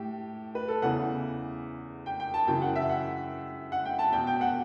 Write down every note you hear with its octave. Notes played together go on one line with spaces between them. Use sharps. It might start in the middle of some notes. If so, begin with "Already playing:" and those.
Already playing: A2 E3 G4
B4
A4
E2 C#3 E3 F#5
G5
G5
A5
F#2 C#3 E3 G5
F#5
E5
F#5
F#5
G5
A5
E2 B2 G5
G5
F#5